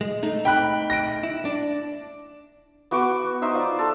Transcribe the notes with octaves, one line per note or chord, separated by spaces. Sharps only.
G#3
A3 D#4
G5 B5 F#6
A#6 D7
E4
D4
B3 F#4 C#6 D6
D#4 C5 E5
F4 D5
A4